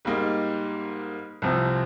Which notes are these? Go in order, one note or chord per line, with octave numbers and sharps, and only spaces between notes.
G#2 G3 A#3 D#4
C2 C3 F3 C4